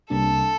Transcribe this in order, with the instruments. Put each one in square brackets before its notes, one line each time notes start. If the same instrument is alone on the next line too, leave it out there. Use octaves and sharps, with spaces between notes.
[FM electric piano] C2 C3 G3 A#3 D4 [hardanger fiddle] A4